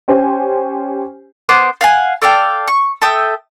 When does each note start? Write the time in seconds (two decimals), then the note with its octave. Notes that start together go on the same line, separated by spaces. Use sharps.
0.08 C#4 G4 C5 G#5
1.49 B3 C5 D6 F#6
1.81 F5 F#5 G#5
2.22 A4 D5 F5 G5
2.68 C#6
3.02 A4 E5 G5 D#6